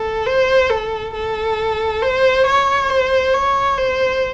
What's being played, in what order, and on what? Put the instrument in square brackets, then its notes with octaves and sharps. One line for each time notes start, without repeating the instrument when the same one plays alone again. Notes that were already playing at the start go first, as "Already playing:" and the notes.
Already playing: [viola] A4
C5
A4
A4
C5
C#5
C5
C#5
C5